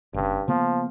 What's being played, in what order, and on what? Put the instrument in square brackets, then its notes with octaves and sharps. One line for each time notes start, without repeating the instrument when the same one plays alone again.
[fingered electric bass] F#1 C#3 [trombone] G2
[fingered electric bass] C#3 A#3 B3 [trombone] F3